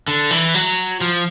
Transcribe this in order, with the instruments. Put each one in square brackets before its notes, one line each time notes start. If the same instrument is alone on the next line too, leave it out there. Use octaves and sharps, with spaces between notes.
[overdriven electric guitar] D3
E3
F#3
F3